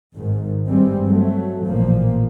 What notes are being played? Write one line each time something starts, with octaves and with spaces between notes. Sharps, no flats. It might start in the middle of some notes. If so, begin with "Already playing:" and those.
G#1 G#2 D#3
G2 G3 G#3 C4
F#3 A3
A1 A#2 F3 A#3